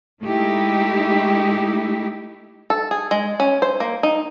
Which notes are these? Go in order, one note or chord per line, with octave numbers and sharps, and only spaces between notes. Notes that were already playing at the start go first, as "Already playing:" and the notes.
G#3 A3 D#4 E4 G4
A4
G#4
G#3
C#4
C5
A#3
D#4